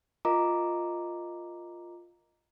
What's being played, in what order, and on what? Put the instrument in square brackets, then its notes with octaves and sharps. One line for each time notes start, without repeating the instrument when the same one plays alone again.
[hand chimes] F4 A#4 D#5 A#5 D6